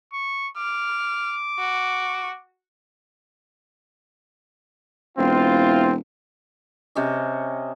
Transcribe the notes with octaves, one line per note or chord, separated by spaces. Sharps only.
C#6
D6 F6
F#4
E1 C4 E4 F4
C3 C#4 D#5